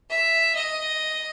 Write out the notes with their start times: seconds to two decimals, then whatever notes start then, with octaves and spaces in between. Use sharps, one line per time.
0.10 E5
0.55 D#5